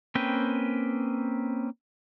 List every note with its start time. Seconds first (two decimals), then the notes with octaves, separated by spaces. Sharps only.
0.15 A#3 C4 C#4 B4 G5